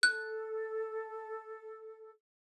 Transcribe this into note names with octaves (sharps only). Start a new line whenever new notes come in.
A4 F#6